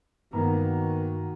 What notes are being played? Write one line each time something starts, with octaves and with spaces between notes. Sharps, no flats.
G2 D#3 A#3 B3 F#4 A#5